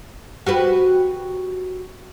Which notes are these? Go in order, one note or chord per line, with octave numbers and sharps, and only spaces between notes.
F#4 G4 B4